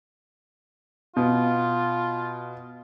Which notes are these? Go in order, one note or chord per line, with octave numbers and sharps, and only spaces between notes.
B2 F4